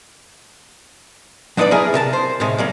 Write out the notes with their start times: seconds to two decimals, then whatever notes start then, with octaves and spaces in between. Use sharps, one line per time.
1.57 F#3 D4 D#4 A#4 B4 D5
1.71 A#3 E4 G#4 A#4
1.94 C3 A#4 A5
2.13 C5
2.40 A2 C3 D#3 G#3
2.58 F#3 G3 A#3